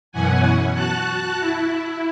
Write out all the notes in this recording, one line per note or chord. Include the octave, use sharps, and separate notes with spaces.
F#2 B2 E3 C#4 F#5 G#5
F#4 A5 F#6
E4